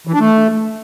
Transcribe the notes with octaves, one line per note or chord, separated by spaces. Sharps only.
E3
D4
A3